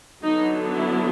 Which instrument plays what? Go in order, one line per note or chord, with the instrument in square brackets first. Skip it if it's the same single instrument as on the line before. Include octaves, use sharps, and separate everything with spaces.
[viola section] D3 F#3 B3 D4 D#4
E4